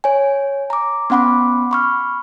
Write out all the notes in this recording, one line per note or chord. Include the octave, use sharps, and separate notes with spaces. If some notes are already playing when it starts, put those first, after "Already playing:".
C#5 G#5
A#5 D6
B3 C#4 F#5 B5 D6
B5 C#6 F6